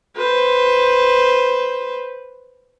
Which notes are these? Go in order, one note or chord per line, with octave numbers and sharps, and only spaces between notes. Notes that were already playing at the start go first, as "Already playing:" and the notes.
B4 C5